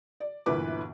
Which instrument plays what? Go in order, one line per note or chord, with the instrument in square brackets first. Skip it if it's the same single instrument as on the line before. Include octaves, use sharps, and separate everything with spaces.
[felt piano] D5
G1 D2 A#2 E3 B4 D6